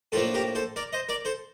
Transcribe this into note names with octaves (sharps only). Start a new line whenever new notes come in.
A2 F3 A#3 D4 F4 A4
G4 A#4
A4 C5
A#4 D5
C5 D#5
A#4 D5
A4 C5